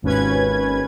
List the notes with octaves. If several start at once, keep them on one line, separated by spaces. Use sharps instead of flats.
G#1 D#2 C#4 B4 G#6